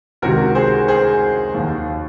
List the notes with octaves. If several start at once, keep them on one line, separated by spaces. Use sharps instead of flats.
C#2 C3 D#3 F#4 A#4
G#4 C5
G#4 C5
D#2 D#3